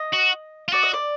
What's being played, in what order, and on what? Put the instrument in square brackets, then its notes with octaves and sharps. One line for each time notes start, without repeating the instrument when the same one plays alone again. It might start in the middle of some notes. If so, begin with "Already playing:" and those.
Already playing: [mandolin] D#5
[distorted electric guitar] F#4
F4
[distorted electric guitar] F#4 [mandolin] D5
[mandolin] D#5
D5